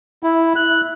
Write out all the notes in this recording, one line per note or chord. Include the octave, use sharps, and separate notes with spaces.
E4
F#6